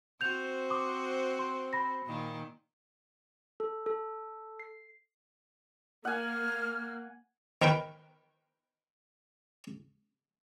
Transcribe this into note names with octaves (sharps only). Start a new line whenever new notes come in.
C4 F#4 C5 G6 F7
C6 D6 D#6
C6
B5 A#6
A#2 D#3
A4
A4
C7
A#3 F#5 G#5 F6
D#3 A#4 B4 G5